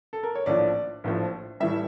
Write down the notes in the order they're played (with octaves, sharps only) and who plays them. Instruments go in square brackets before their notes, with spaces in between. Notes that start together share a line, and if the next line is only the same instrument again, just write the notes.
[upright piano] A4
A#4
C#5
A#1 A2 F3 D5
A#1 A2 F3
A2 E3 G3 E5